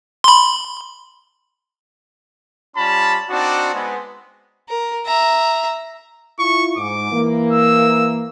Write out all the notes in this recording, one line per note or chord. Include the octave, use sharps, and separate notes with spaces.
B5 C6
G3 C#4 F4 A5 B5
C4 D4 D#4 F#4 D5 A5
G#3 B3 C4
A#4
E5 A#5
E4 F4 C#6
G#2 D6
E3 A#3
E6